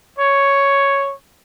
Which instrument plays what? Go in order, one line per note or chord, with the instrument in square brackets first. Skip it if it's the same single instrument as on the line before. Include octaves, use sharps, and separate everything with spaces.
[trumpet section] C#5